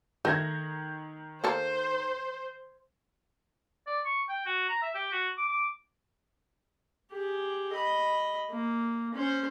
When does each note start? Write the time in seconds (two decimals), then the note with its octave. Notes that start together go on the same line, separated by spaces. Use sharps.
0.25 D#3 A3 G6 G#6 A#6
1.44 A#3 A4 C5
3.87 D5
4.05 C#6
4.29 G5
4.45 F#4
4.69 A#5
4.82 E5
4.95 G4
5.12 F#4
5.37 D6
5.49 D6
7.11 G4 G#4
7.72 D#5 B5
8.50 A#3
9.14 C#4 C5